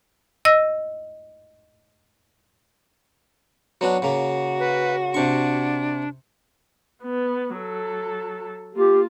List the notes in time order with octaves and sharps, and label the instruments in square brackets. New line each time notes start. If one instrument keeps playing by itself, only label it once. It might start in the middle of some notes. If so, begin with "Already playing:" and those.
[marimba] D#5 E6 A#6
[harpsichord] F#3 B3 D4 [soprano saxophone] F#4
[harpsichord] C#3 A#3
[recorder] B4
[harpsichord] C3 C#6 [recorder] D4
[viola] B3
F#3 A4
[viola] A#3 F4 [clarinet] G4